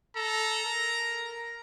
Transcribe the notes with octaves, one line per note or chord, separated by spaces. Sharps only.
A4 A#5
A#4